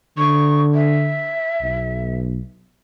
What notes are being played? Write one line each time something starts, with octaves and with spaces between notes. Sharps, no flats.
D3 C#6
E5
B1